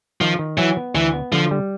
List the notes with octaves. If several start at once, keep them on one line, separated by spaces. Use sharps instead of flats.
D#3 F3
D#3
E3 F#3
B3
D2 E3
B3
D3 F3
G3